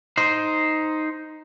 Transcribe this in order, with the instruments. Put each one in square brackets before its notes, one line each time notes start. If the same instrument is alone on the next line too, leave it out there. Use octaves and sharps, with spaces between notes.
[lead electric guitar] D#4 C5